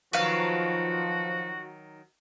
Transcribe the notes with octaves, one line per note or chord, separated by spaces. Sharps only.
D#3 F3 F#3 F#4 B4 F5